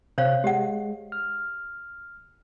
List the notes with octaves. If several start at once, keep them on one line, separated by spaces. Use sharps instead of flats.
C3 C5 C#5 F5 F#6
G#3 G4 F#5
F6